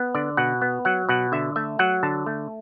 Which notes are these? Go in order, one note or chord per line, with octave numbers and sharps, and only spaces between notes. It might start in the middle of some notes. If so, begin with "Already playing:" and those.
Already playing: B3
D3 D5
B2 F#5
B3
F#3 F#5
B2 F#5
D3 E5
A3 E5
F#3 F#5
D3 A5
A3